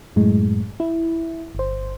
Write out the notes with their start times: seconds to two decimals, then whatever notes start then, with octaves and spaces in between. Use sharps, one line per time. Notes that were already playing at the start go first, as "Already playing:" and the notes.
0.16 F#2 A2 G#3
0.80 E4
1.55 G1 C5